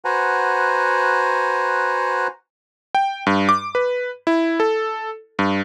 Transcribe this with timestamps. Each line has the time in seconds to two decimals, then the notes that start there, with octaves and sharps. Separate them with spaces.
0.05 F#4 B4 C5 F#5 G#5 A#5
2.95 G5
3.27 G2
3.49 D6
3.75 B4
4.27 E4
4.60 A4
5.39 G2